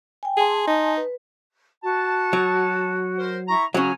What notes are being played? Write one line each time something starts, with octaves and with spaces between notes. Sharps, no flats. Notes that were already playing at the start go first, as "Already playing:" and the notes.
G5 G#5
G#4 G#5 A5 C6
D#4
B4
F#4 A5
F#3
A#4 C5
E4 A#5 C#6
C#3 F#3 C#4 G#5 A#5